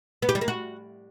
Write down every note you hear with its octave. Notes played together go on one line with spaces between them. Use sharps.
B3
G4
G3
A#3
F#4